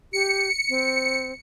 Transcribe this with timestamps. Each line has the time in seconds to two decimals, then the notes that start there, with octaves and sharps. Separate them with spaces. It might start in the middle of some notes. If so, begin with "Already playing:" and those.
0.13 G4 C#7
0.69 C4